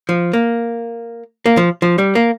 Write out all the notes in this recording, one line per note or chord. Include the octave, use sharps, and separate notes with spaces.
F3
A#3
A#3
F3
F3
G3
A#3